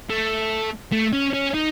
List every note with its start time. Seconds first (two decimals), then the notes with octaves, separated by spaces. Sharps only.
0.10 A3
0.92 A3
1.13 C#4
1.34 C#4
1.54 D#4